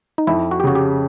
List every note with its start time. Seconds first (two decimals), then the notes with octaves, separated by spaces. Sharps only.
0.18 D#4
0.27 F2 E4
0.51 F#4
0.60 G4
0.64 C#3 F#4
0.75 G4